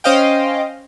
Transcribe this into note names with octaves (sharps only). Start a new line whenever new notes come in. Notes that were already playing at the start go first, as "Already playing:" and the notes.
C#4 C5 D#5 F5 G5